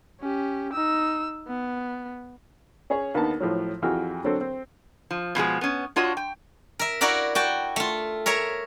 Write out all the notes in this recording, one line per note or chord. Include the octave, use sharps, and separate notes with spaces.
C#4 G4
D#4 E6
B3
C#4 G#4 C#5
D#2 B3 D4 D#4 A5
A2 F3 F#3
F2 E3 F#4 G#4 G5 F6
D3 F#3 C4 A4
C4
F3
B2 F3 G#3 G#4
B3 C#4
D4 F4 F#4 C#5 D#5
G5
A#4 E5
E4 F#4 A#4 D5 F5
F#4 G5 A5
A3 F4
A#4 C#5 E5 A#5